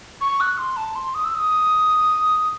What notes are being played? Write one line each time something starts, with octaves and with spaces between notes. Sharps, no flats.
C#6
F#6
C6
A5
C6
D#6
E6
D#6